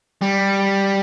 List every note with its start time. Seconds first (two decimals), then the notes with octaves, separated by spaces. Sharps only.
0.21 G3